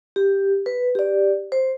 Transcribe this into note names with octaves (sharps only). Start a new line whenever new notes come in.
G4
B4
G4 D5
C5